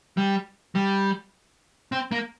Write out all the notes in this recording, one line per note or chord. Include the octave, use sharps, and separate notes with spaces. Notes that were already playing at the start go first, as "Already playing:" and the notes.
G3
G3
C4
A#3